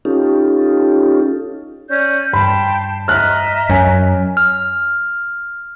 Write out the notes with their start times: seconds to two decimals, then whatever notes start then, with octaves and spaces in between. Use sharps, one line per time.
0.05 C#4 D#4 F4 G4 A4
1.90 C#4 D5 G6
2.33 G2 G5 A5 B5 C6
3.08 D#5 E5 A#5 F6 F#6
3.69 F#2 C#5 G#5
4.37 F6